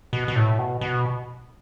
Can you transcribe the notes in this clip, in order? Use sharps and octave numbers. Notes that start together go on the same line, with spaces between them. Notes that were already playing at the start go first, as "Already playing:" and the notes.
B2
B2
A2
B2
B2